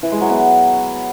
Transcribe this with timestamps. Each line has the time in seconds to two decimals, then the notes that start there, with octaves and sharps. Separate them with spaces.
0.03 E3
0.12 G#3
0.21 F#3
0.30 B3